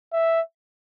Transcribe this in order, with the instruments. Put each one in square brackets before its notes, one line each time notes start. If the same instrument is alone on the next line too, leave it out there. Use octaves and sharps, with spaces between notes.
[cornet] E5